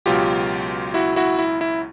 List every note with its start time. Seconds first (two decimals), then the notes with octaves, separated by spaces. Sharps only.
0.06 C#2 B2 F#3 F4 G4
0.94 E4 F#4
1.16 E4 F#4
1.39 E4
1.61 E4